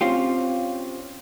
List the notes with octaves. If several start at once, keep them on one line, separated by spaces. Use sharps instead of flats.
C4 C#4 F4 G4